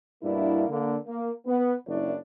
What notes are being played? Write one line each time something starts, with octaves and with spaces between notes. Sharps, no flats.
G2 B2 A#3 D4 E4
D3 A#3
A#3
B3
F#1 C#2 F#2 D4 E4 C#5